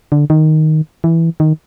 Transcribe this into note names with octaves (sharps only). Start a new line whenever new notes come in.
D3
D#3
E3
D#3